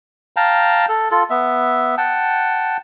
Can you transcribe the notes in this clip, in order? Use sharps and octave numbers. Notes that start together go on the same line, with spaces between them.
F5 G5 A5 A#5
A4
F4 A4
B3 E5
F#5 G5 A5